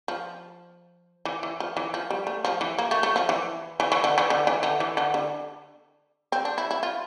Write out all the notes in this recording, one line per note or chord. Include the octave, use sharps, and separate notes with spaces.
F3
E3
E3
F3
E3
F3
G3
A3
F3
E3
A#3
A3
A3
F3
E3
E3
E3
D3
E3
D3
E3
D3
E3
D3
D3
C4
D4
E4
E4
F4